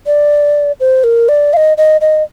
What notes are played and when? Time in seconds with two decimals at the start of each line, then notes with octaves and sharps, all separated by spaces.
0.06 D5
0.80 C5
1.04 A#4
1.28 D5
1.53 F5
1.57 D#5
1.77 D#5
2.01 D#5